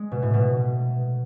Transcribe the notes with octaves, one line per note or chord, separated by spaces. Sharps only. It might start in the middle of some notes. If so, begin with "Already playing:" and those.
Already playing: G#3
B2
A2
B2